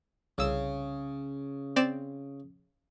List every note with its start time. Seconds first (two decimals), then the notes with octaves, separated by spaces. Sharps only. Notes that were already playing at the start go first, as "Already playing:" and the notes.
0.38 C2 C#3 E6 E7
1.76 C4 D5 E7